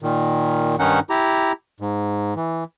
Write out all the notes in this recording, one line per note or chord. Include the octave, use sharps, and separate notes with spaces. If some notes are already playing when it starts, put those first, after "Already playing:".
A#2 D#3
G2 D#3 C#4 D#4 F#5
E4 G4 A#5
G#2
E3